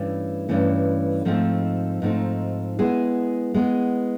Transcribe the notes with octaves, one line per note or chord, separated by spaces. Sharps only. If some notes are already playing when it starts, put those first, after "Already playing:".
Already playing: G2 E3 A3 C#4
G2 E3 A3 C#4
G#2 F3 A3 C4 D#4
G#2 F3 A3 C4 D#4
G#3 B3 E4 G#4
G#3 B3 E4 G#4